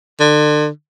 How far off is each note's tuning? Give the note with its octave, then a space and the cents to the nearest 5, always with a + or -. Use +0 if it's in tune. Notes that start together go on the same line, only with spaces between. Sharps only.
D3 +35